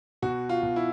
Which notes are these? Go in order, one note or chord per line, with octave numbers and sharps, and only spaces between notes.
B2 F#4
F4
B2
E4